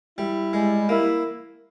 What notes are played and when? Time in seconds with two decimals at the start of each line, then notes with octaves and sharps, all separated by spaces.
0.18 G3 E4
0.53 G3 G#3
0.89 A#3 E4